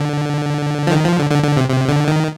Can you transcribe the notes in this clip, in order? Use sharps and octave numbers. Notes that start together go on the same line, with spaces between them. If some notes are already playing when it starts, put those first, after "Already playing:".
Already playing: D3
F3
D#3
F3
D3
D3
D3
C3
C3
D3
D#3